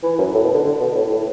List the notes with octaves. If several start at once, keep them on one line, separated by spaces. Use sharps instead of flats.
E3
F#2
A2
B2
D3
D3
B2
A2
A2